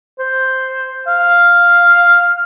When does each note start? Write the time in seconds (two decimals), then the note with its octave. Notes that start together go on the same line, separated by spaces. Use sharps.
0.19 C5
1.07 F5